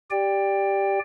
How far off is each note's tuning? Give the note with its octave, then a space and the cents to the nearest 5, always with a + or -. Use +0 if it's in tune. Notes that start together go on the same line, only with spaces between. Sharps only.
G4 +0 D5 +0 G5 +15